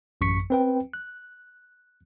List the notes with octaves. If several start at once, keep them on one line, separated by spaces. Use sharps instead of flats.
A1 F#2 C#6 B6 C#7
C4 B4 G5
F#6